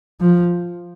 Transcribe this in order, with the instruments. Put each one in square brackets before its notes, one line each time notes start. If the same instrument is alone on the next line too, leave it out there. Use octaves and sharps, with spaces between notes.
[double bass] F3